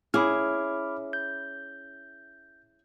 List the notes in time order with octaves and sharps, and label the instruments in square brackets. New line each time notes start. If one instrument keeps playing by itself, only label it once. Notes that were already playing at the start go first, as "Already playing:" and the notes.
[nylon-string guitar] C#4 E4 G#4 [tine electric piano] B5 D6 F6
[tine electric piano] G6